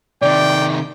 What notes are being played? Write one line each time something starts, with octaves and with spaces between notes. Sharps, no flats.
C3 D#3 D5 G5